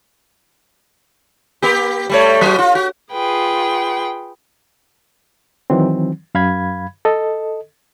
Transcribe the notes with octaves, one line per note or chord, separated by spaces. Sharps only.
A#3 G4
G3 A3 C#5
F#3 F#4
F4
F#4
F4 G#4 B4 G5
D#3 E3 F#3 C4
F#2 F5 B5 G#6
A4 D#5